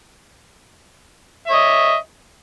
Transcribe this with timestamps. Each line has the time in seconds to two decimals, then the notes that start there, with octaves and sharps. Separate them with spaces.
1.47 E5
1.50 C#5
1.53 D#5